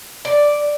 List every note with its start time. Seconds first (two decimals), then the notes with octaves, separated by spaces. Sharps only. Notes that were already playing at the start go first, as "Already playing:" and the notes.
0.25 D5